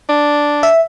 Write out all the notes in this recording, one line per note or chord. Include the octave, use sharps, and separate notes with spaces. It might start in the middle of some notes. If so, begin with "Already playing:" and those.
D4
E5